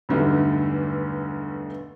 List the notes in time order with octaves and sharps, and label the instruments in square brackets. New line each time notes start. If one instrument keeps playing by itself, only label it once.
[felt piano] B1 E2 G2 D3 G3 A3